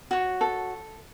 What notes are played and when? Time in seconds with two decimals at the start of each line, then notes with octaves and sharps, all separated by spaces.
0.11 F#4 C#5
0.41 A4